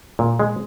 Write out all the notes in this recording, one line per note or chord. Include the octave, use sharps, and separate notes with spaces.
A#2
G#3